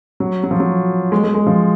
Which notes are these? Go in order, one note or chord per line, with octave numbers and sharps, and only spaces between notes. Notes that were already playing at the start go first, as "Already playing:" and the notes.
F#3
F#3
F3
F#3
G#3
G#3
G#3
F3